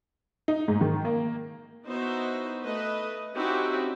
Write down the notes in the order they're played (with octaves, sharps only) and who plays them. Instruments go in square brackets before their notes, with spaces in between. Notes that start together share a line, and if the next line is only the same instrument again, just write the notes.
[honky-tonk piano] D#4
G#2
D#3
A#3
[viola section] B3 D#4 E4 F#4 C5
A3 B4 D#5
C4 C#4 D#4 E4 F#4 G4